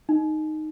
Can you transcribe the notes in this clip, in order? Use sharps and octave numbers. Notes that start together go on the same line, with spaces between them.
D#4